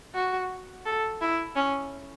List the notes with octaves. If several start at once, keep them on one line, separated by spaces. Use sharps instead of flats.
F#4
A4
E4
C#4